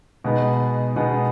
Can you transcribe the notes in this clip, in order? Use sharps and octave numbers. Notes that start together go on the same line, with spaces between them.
B2 G#3 B3 D#4
B2 G#3 B3 D#4